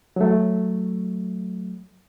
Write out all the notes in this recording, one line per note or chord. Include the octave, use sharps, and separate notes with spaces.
F#3 A3